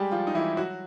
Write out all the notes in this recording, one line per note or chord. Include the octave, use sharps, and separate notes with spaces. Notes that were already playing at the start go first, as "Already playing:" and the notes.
Already playing: G3 G#3 G4 G#4
F3 F4
D#4
E3 E4
F#3 F#4